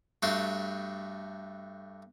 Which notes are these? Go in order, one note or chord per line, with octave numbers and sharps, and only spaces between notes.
G2 A3 F#4 G4 C6